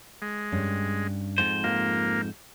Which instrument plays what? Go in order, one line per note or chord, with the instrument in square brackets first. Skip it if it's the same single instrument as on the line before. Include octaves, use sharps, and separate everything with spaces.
[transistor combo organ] G#3
[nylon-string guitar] G2 C#4
[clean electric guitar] F2 G#2 C5
[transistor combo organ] A#3 [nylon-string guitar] F4